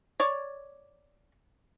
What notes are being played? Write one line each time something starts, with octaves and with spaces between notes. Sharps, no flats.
C#5 D5